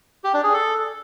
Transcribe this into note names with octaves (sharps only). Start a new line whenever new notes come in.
G4
D4
G#4
A4